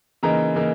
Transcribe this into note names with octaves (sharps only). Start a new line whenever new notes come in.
C#3 E3 A#3 D#4 A#5
C#3 E3 A#3 D#4